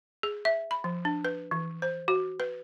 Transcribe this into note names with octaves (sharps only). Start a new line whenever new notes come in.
G#4
E5
B5
F3
D4
B4
E3
C5
F#4
B4